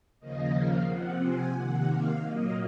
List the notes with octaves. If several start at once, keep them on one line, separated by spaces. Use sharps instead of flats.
D#2 C#3 F3 A#3 D#5
F5
C3 F3 C4 F#5
G#5
C3 D#3 A#3 F#5
F5
A#2 F#3 A#3 D#5